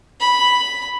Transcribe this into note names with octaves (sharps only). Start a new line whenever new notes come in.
B5